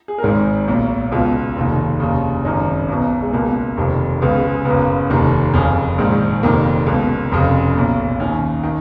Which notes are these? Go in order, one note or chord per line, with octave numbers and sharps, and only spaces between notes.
G#4
A#4
G#1 G#2 D#3 G#4
B1 A#2
C#2 B2 F4
F1 D#2 D#3
F1 D#2 C#3
G#1 F#2 C#3 D#4
B1 B2
G#3
C#2 B2 A#3
F1 F2 D#3
C#2 C#3 B3
G#3
F#1 F#2 C#3 B3
F1 D#2 D#3
F#1 F2 C#3 C#4
A#1 G#2 D#3
F1 F2 D#3 A#3
C#2 B2
F1 F2 C#3
B1 A#2
D#2 D#3 C#4
D#3